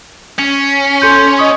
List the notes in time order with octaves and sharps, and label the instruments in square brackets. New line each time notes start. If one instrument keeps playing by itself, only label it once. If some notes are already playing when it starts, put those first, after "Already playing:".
[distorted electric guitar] C#4
[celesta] A4 C6 G6
D#5 C#6 D#6